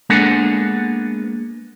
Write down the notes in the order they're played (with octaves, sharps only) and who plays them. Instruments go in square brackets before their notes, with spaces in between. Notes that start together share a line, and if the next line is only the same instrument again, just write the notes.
[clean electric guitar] G#3 A#3 B3 D4 A4 F#5